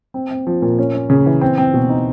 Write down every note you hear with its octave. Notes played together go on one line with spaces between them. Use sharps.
C4
C4
F3
A#2
C#4
C#4
C#3
E3
C4
C4
B2
D#4